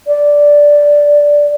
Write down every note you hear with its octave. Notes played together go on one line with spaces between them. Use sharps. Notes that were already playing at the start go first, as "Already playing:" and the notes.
D5